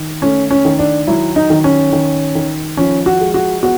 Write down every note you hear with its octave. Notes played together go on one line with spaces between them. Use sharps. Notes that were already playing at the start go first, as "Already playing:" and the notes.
Already playing: D#3
A3 C#4
C#4
D#3
D4
F#3 E4
D#4
D#3
C#4
D#3
D#3
F3 C#4
F#4
G#3
F#4
B3 F#4